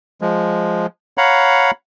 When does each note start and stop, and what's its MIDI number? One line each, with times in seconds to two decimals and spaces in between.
0.21 0.86 53
0.21 0.86 56
1.18 1.71 73
1.18 1.71 77
1.18 1.71 78
1.18 1.71 82
1.18 1.71 83